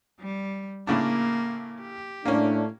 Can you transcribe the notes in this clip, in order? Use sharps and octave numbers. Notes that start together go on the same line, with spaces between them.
G3
A2 C#3 A#3 D4
G4
A2 A3 A#3 C#4 D4